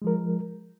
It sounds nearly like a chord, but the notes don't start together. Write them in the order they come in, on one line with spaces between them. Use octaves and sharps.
G#3 F3 A#4